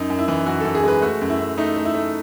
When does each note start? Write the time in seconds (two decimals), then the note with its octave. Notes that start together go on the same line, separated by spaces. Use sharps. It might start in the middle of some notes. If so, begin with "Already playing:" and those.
Already playing: F#2 D#4
0.10 F#2
0.19 E4
0.28 E3
0.46 F#2 F#4
0.60 F#2 A4
0.75 G#4
0.84 G#3 B4
1.02 A3 F#4
1.21 F#2
1.30 E4
1.39 F#2
1.58 A3 D#4
1.76 A3
1.85 E4
1.95 A3